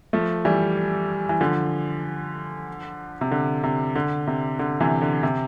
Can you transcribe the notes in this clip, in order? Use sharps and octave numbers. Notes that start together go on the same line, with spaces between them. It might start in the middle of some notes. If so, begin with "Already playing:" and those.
F3 A3
E3 G3
E3
D3 F3
C3
D3
C3
D3
C3
D3
C3 E3
D3
C3